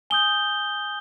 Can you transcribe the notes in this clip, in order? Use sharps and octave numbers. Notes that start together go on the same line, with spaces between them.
G#5 D#6 G6 G7